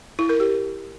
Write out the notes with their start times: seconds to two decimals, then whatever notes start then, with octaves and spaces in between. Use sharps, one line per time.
0.19 E4
0.29 A#4
0.40 G4